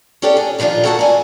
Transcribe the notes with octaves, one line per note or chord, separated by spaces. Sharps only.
C#4 D4 G4 A4 D5
G#4
A#2 D#3 F3 D4 F4
A#3 F#4 A4 F#5 A5
G#3 D5 G#5